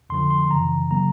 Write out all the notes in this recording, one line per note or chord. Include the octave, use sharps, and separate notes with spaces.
F2 D3 F3 C6
C6
F#2 C#3 E3 A#5
C#3 F#3 A#3 A#5